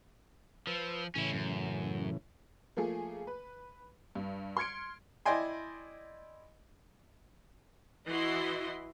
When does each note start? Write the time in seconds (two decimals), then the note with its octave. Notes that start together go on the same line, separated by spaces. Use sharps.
0.67 F3 B4 E6
1.15 A2 C#3 E3 C#4 E4
1.33 F#2
2.77 F3 A3 A#3 G#4
3.27 B4
4.15 G2
4.57 C6 F6 G#6 C#7 D7
5.26 E4 D5 D#5 G5 G#5 C6
8.09 E3 E4 F#4 D#5 C6